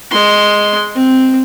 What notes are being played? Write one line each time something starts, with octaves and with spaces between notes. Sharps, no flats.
G#3 C6
C4